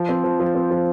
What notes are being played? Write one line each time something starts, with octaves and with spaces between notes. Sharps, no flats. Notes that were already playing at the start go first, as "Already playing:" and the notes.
Already playing: F3
C4
F3
F3
C4
F3